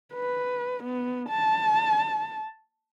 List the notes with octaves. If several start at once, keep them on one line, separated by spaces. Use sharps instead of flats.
B4
B3
A5